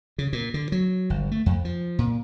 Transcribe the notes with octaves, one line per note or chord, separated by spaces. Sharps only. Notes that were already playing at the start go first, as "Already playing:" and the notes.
C#3
A#2
D3
F#3
G1
A3
F2
F3
A#2